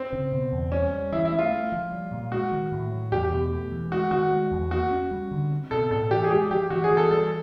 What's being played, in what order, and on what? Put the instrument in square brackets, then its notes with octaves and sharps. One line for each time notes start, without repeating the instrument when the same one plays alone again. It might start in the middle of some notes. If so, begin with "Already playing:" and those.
Already playing: [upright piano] C4
[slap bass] C#3
B2
E2
[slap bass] G3 [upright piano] C#4
[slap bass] G3
[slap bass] E3 [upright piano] E4
[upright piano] E4
[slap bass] A3
[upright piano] F4
[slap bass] A3
F3
G3
A#2
[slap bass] G#3 [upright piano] F#4
[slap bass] D#3
A2
F#3
[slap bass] E2 [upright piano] G4
[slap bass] B2
A3
E3
[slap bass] G#3 [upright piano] F#4
[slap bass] D#3 [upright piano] F#4
[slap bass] G#3
E2
[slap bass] A#3 [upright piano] F#4
[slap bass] C#4
G3
D3
C4
[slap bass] B2 [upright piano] A4
[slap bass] A2 [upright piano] A4
[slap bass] E3 [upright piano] G4
[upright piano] G#4
[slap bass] G#3 [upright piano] G4
[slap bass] F3 [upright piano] G4
[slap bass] E3 [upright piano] F#4
[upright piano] G#4
[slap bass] E3
[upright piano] A4
[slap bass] G3 [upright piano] A4